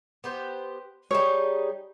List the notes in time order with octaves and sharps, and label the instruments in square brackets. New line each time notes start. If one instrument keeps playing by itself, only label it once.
[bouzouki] B3 G4 C5
[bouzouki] G3 D#4 G#4 [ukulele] C#5